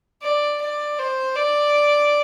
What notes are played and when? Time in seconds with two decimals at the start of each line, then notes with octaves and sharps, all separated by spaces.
0.22 D5
0.61 D5
0.98 C5
1.36 D5